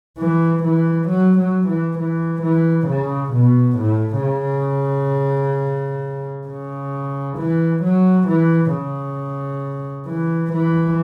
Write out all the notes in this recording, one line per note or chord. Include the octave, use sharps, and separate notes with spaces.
E3
E3
F#3
F#3
E3
E3
E3
C#3
B2
A2
C#3
C#3
E3
F#3
E3
C#3
E3
E3